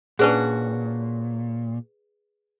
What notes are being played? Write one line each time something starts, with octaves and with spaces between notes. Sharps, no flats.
A#2 C#4 D4 F#4 G#4 B4